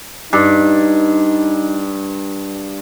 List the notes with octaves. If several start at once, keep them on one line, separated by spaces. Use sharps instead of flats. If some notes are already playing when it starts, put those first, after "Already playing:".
G2 D#4